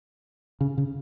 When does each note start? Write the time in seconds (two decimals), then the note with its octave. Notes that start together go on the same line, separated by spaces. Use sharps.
0.61 C#3
0.78 C#3